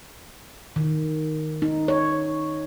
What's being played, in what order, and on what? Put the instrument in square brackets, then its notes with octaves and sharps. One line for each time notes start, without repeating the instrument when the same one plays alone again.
[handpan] D#3
D#4
C#5